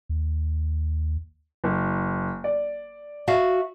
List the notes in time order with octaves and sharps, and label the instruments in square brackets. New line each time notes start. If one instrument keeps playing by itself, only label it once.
[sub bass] D#2
[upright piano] F#1
D5
[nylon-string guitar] F#4 E5 F5